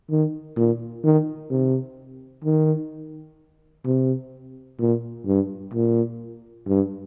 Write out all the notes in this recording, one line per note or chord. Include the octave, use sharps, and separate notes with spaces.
D#3
A#2
D#3
C3
D#3
C3
A#2
G2
A#2
G2